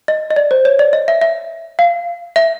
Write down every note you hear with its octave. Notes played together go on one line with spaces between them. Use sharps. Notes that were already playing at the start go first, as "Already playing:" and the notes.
D#5
D#5
D5
C5
C#5
D5
D#5
E5
E5
F5
E5